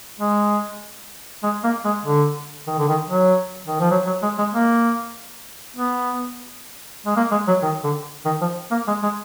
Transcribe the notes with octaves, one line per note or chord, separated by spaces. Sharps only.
G#3
G#3
A#3
G#3
D3
D#3
D3
D#3
F#3
D#3
F3
F#3
F#3
G#3
G#3
A#3
B3
G#3
A#3
G#3
F#3
D#3
D3
D#3
F3
A#3
G#3
G#3